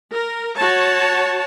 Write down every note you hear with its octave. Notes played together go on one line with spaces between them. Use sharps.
A#4
F#4 C#5 A5